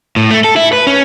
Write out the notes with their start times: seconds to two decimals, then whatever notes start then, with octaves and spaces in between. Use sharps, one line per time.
0.16 A2
0.31 A3
0.44 A4
0.56 E4
0.73 B4
0.87 C#4